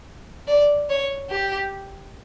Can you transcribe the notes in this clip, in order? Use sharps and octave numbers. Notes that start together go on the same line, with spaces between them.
D5
C#5
G4